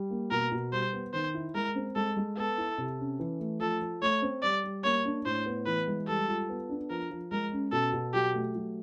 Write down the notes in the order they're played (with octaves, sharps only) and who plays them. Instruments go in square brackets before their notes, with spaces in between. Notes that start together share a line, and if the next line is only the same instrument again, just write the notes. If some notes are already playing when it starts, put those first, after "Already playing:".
Already playing: [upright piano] G3
A#3
[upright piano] B2 [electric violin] A#4
[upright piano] B2
[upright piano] G3 [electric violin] C5
[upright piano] B3
[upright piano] D#3 [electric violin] C5
[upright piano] E4
[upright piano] G#3 [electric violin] A#4
[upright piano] C4
[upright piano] G#3 [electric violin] A4
[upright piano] G#3
[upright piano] B3 [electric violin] A4
[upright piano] E4
C3
C#4
E3
A3
[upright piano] F3 [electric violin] A4
[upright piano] F3
[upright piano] A3 [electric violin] C#5
[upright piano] C4
[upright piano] G3 [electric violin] D5
[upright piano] G3
[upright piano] A#3 [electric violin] C#5
[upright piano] D4
[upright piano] A2 [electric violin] C5
[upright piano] B3
[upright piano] E3 [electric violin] B4
[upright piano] G#3
[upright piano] G3 [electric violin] A4
[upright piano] F4
B3
D4
[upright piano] F3 [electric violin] A#4
[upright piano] F3
[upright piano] G#3 [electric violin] A#4
[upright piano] C#4
[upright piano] B2 [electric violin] A4
[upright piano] B2
[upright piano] F#3 [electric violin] G4
[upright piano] A3
F#3